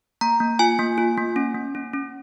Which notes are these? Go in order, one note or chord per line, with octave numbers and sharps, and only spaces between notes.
A#3 A#5
A#3
F4 G#5
A#3
F4
A#3
C#4
A#3
C#4
C#4